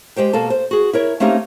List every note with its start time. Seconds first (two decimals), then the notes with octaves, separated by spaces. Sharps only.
0.16 G#3 G4 C5 G5
0.33 B2 A#3 A4 A5
0.50 C5
0.71 F#4 G#4
0.93 E4 A#4 C#5
1.20 A3 A#3 C4 C#4 D#4 G4